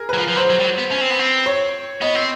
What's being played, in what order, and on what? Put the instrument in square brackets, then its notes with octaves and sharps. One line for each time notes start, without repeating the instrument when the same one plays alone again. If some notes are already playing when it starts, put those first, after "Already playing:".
Already playing: [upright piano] G#4 A#4
[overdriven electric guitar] F#3 [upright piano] B4
[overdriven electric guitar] F3
F3
[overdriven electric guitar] F#3 [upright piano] C5
[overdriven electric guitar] F#3
G3
F#3
B3
C#4
C4
B3
C4
[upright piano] C#5
[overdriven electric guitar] B3 [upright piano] D#5
[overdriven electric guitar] C4